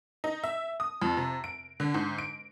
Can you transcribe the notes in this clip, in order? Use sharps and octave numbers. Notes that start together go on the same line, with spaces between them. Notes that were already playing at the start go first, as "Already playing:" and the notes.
D#4
E5
D#6
F2
C3
D7
D3
G#2
D7